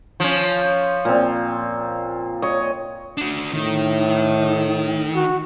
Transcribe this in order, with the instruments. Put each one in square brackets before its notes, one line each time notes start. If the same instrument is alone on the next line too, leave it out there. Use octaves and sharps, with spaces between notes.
[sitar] F3 C#4
[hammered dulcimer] A#2 C4
C#5 D#5
[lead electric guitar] D4 F#4
[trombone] A2 [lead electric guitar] D#3
[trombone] F#4